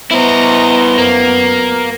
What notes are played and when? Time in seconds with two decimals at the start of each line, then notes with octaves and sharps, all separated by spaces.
0.11 B3 E4 C5 D#5 A#5 C#6
0.98 F#2 A#3